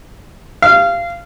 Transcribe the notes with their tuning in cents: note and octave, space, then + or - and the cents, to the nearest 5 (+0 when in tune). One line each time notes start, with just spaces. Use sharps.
F5 -20